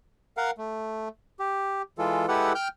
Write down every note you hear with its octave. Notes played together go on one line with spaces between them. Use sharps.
A#4 F5 F#5
A3
G4
E3 G#3 F4 A4
G#3 E4 G4 A4 B4 F#5
G5 F6 G6